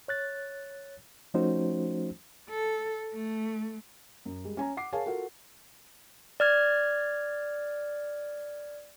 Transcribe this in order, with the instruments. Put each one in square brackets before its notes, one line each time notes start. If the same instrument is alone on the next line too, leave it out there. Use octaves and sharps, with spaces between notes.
[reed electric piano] C#5 F#6 A6
F3 A3 C#4 D#4 F#4 C5
[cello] A4
A3
[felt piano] F#2
G3 G#3
C#4 G#5 A#5
F#5 D6 C7
G#4 A#4 C#5 F5 G#5 A5
F4 F#4 A4 A#4 F#5
[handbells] D5 F6 G#6